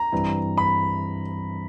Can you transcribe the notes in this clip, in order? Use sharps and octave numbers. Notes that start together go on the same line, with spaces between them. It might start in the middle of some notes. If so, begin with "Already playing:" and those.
Already playing: A#5
G2 E3 G3 C4 E4
B5